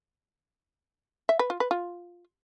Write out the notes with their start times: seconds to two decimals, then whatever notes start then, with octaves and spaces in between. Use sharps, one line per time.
1.29 E5
1.39 B4
1.50 F4
1.60 B4
1.71 F4